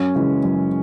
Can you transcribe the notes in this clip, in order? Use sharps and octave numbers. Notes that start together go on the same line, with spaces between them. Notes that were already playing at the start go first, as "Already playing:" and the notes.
Already playing: F#2 C#4
C#3 E3 G#3
F#2